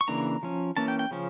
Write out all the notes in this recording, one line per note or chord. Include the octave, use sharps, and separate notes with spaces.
C#6
C#3 E3 A#3 D4 A#5
F3 C#4
E3 A#3 C#4 A5
G5
G5
C#3 F3 C#4